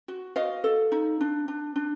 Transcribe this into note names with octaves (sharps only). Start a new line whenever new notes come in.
F#4
F#4 D#5 F5
A4
D#4
D4
D4
D4